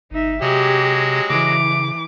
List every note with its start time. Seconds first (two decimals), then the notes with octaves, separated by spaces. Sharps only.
0.11 G1 D#4 E5
0.42 C3 F#3 G#3 G4
1.30 C#3 E3 D6